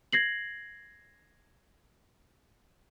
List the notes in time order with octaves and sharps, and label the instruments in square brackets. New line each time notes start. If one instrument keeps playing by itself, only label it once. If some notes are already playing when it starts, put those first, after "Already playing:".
[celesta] G#6 A#6 C7 F#7